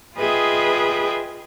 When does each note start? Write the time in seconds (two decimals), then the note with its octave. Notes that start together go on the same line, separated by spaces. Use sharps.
0.17 F4 G#4 B4 D#5 E5 G5